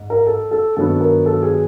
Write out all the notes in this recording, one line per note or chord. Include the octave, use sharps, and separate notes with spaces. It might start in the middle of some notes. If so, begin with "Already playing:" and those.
Already playing: G#2
A#4
A4
A4
G2 D#3 F#3 B3 A4
A#4
A4
G#4